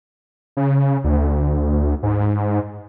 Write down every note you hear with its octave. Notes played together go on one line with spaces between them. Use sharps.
C#3
D2
G#2